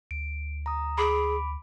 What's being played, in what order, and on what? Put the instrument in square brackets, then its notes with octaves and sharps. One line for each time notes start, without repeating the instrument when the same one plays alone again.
[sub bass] D2 [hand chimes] D7
[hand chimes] A#5 D#6
[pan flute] G#4 [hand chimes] B5 D6 D7